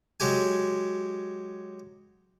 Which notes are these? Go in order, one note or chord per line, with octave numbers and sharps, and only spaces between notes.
F#3 G#3 G4 G#5